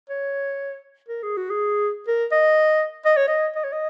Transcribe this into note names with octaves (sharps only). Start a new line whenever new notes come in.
C#5
A#4
G#4
F#4
G#4
A#4
D#5
D#5
C#5
D#5
D#5
C#5
D#5